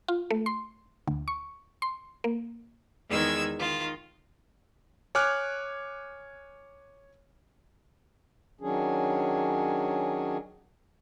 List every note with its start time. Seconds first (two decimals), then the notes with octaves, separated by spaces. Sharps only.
0.08 F4
0.31 A3
0.46 C6
1.07 D2
1.28 C#6
1.82 C6
2.24 A#3
3.09 E2 D#3 G#3 E6 G#6
3.58 D#3 F4
5.15 C#5 G#5 D6 F6 F#6
8.61 D#3 F#3 C#4 D4 G#4